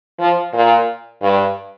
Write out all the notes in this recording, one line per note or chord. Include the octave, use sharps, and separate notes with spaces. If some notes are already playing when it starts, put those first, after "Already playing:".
F3
A#2
G2